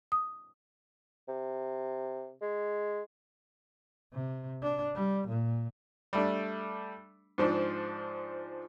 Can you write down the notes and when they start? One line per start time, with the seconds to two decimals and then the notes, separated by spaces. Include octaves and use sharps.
0.12 D#6
1.28 C3
2.42 G#3
4.13 C3
4.62 D4
4.95 G3
5.28 A#2
6.13 G3 A3 D4
7.38 G#2 F3 D4